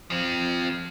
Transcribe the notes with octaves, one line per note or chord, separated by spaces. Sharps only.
F3 C4